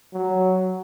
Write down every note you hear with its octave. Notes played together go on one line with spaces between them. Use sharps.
F#3